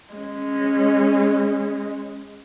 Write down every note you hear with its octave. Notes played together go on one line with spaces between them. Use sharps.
G#3 C#4